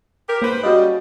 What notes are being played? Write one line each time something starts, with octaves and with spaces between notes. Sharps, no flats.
G4 A#4
G#2 A#3 B4 C5
C#3 G3 F#4 D#5